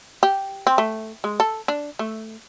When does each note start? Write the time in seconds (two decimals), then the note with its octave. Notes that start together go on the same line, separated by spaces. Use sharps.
0.23 G4
0.67 C4
0.78 A3
1.24 G#3
1.40 A4
1.68 D4
1.99 A3